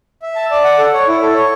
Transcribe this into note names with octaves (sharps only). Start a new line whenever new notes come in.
E5
A5
D5
F#5
A4
C#5
E4
A4
C#5